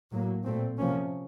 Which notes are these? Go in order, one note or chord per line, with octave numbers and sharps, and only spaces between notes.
A2 F#3 A#3
A#2 A3 C4
C3 F3 A#3 C#4